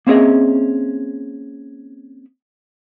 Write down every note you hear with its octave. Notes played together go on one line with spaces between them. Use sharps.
A#3 C4 C#4 G#4 D#5 E5